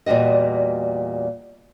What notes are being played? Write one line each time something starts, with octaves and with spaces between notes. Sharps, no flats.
E2 A#2 G3 F#4 D#5